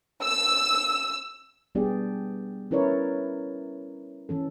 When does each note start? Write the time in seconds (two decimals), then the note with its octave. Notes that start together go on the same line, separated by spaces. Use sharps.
0.23 E6
1.75 G3 B3 D4 G4 G#4 D5
2.71 C#4 E4 A#4 B4 C#5 D5
4.29 E3 C#4 A4